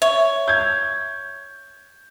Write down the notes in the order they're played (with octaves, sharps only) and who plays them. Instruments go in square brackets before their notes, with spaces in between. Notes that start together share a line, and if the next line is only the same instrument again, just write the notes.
[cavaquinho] C#5 [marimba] E5
[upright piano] G6 G#6